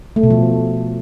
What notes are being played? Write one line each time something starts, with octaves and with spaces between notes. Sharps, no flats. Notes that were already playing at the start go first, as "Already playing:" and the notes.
A3
B2
F3